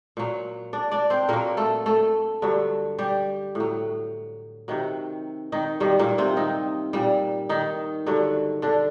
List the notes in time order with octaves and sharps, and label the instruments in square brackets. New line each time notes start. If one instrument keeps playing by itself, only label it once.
[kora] A#2 F#3
D4 D5
D4 D5
C4 C5
A#2 F#3 A#3 A#4
A3 A4
A3 A4
G2 D3 F#3
G3 G4
A2 F#3
C3 D#3 F#3
D#3 D#4
G2 D#3 F#3 G3
A#2 A#3
C3 C4
D#3 D#4
A#2 G3
D#3 D#4
G2 D3 F#3
D3 D4